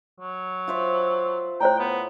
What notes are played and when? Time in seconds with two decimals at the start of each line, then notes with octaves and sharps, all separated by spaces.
0.20 F#3
0.68 F4 C5 E5
1.61 A2 C5 C#5 G5 A#5
1.79 B3